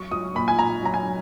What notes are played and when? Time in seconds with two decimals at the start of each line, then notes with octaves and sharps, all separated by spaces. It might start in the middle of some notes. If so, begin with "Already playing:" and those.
Already playing: F#3 C#6
0.11 F#3 D#6
0.35 A#2 B5
0.48 G#5
0.58 A#2 A#5
0.83 F#3 A#5
0.94 G#5
1.06 F#3